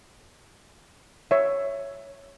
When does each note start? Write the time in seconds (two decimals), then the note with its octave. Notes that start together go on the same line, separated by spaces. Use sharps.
1.31 C#5 E5